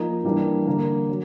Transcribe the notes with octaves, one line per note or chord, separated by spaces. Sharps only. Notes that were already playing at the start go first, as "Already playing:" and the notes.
Already playing: F3 A#3 D#4
E3 G3 A#3 D4
D3 G3 A#3
F#3